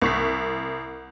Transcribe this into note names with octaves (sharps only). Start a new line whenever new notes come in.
C2 C#6 B6